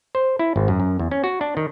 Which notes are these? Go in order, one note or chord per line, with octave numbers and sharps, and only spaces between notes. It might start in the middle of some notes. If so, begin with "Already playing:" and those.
C5
E4
G#1
F#2
F#2
E2
C#4
F#4
D4
D#3